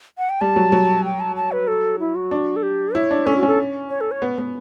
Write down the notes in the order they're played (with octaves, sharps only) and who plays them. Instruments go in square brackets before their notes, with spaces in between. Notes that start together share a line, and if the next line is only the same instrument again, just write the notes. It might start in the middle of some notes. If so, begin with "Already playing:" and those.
[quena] F#5
G5
[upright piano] G3 [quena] A5
[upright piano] F#3
F#3
[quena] G5
A5
A5
B4
A4
E4
F#4
[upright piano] D4
[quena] A4
G4
[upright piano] E4 [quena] C#5
[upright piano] D4
[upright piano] C#4 [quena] A4
[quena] F#4
[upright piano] C#4 [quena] A4
[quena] C#5
A4
C#5
[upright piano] B3
B3